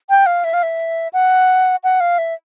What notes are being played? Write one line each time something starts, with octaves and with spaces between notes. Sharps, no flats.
G5
F5
E5
F5
E5
F#5
F#5
F5
E5